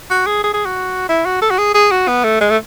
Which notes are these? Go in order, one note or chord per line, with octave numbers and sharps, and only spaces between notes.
F#4
G#4
G#4
G#4
F#4
E4
F#4
A4
F#4
G#4
G#4
F#4
B3
A3
G#3
A3